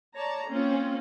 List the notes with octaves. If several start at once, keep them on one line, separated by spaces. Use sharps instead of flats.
C#5 D5 A5 A#5
A#3 C4 C#4 F4